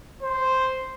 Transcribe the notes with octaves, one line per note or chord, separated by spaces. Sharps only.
C5